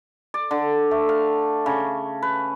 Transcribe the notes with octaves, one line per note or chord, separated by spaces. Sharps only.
D5
D3
A3
F5
C#3
B4